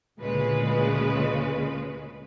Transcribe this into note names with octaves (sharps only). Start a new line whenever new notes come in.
D2 A#2 C#3 G#3 B4